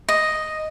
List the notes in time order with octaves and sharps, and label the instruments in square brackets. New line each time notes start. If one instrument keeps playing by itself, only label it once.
[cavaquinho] D#5